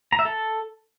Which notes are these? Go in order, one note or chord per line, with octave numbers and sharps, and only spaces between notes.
A#5
E5
A4